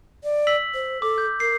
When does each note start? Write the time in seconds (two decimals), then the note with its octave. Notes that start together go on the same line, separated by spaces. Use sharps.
0.24 D5
0.47 E6 B6 F#7
0.74 C5
1.02 A4 D6
1.18 G6
1.40 A#4 C7